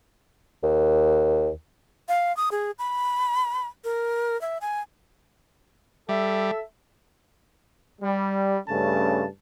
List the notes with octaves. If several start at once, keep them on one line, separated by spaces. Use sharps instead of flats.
D#2
F5
D#6
G#4
B5
A#4
E5
G#5
G3 A4 E5
G3
G2 C#3 A3 C#4 A5